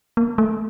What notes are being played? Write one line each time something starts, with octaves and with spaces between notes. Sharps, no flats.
A#3
A3